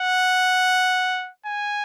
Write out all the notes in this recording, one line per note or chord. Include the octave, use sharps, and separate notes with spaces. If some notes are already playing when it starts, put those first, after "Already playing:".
Already playing: F#5
G#5